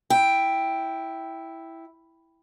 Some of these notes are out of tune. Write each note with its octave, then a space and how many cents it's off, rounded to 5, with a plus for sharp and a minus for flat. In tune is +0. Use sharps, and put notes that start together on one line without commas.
E4 +0 G5 +0